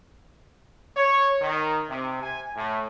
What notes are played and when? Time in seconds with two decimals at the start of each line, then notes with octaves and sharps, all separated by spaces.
0.96 C#5
1.41 D#3
1.89 C3
2.23 G#5
2.56 A2